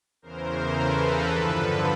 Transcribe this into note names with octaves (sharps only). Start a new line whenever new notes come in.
E2 C#3 E3 A#4 C5
A4 B4
G2 D3 F3